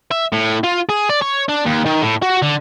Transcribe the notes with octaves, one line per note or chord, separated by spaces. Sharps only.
E5
A2
F4
G#4
D5
C#5
D4
D#2
D#3
A2
F#4
D3